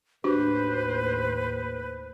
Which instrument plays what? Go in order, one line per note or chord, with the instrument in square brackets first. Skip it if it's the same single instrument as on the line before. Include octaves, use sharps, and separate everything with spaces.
[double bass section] D#2 A2 [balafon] D4 F#4 G4 [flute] B4 [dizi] C5